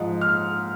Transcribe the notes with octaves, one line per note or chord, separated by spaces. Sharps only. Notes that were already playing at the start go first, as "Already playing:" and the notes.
Already playing: G#2 F3
F6